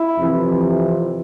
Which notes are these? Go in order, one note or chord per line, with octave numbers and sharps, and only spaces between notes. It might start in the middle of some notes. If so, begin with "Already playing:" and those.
Already playing: E4
F2 C3 E3